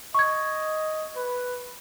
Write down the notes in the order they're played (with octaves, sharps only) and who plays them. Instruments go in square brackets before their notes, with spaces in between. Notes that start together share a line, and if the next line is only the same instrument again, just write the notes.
[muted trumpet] D#5 [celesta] C#6 G#6
[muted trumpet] B4